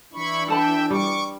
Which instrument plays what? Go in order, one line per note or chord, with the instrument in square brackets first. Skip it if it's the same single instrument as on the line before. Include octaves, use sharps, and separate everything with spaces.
[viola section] E3 D4 [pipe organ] E4 B5 C#6
[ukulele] A4 A5 B5 [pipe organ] E5 G5
[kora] G3 [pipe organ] C#6 D6